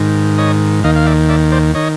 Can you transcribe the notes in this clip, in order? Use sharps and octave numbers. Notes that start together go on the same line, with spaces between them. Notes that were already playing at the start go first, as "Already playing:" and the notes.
Already playing: G#2 D#3
C#5 D#5
D#2 D#3 D#5 F5
F5
D5 E5
D5 E5
C5 D5
D#3 C#5 D#5